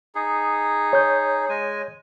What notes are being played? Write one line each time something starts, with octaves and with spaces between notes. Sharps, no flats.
D#4 G#4
C#5 G6
G#3 G#5